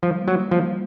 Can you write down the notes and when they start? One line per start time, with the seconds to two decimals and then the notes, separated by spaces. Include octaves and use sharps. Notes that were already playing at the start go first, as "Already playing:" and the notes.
0.03 F3 G3
0.21 A#3
0.28 F#3
0.39 A#3
0.51 F3
0.58 G3